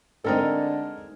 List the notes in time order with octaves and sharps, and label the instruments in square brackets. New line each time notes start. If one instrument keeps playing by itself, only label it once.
[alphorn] D3 [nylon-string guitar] G#3 C4 D#4 [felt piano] A4 A#4 D#5